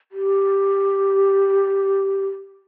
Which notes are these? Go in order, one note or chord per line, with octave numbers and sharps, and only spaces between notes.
G4